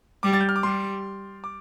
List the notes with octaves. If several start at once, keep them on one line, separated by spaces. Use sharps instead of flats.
G3 D6
A6
G6
F6
D6
G3 C6
D6